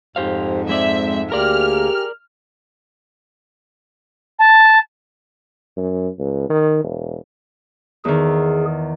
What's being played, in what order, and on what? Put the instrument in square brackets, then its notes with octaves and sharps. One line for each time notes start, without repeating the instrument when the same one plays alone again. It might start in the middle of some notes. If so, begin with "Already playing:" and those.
[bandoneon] F2 G#2 [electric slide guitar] G4 C5 F5
[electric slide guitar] G#3 C4 D5 [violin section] E5
[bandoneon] D2 A#3 [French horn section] G4 G#4 [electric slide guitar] A#4 D5 [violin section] F6
[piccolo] A5
[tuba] F#2
C#2
D#3
E1
[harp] E2 D#3 [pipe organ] G#4